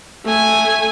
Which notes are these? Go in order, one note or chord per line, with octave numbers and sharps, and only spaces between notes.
A3 G#5